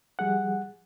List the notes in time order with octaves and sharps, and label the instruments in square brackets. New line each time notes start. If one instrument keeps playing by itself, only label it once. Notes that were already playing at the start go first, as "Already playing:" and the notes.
[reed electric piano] F3 G3 G#4 F#5